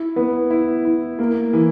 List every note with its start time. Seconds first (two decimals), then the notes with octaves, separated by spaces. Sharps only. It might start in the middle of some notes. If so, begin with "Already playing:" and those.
Already playing: E4
0.16 B3
0.50 E4
0.85 E4
1.19 A#3
1.53 E3